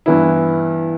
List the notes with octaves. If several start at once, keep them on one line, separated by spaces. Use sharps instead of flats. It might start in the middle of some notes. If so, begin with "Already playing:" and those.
G2 E3 B3 E4